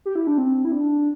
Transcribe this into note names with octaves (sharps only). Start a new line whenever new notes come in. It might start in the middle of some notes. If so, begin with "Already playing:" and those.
G4
E4
D4
C4
E4
D4